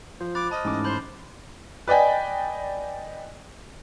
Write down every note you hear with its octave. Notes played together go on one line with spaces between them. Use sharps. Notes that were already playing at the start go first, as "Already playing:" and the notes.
F3 C5
B5 D6 F#6 A6
D#5 A5 F6
A1 G#2 D6
C5 B5 C6 G6
B4 D5 D#5 G5 G#5